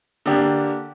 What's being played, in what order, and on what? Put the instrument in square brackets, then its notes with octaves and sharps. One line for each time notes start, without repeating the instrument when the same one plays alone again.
[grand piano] D3 A#3 D4 G4